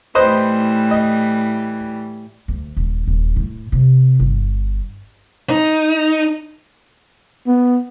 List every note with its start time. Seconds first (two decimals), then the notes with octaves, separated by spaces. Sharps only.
0.15 A2 E3 G3 B4 C5 D#5
0.91 D#5
2.48 D2
2.77 D#1
3.07 D#1
3.36 A2
3.72 C3
4.20 G1
5.50 D#4
7.47 B3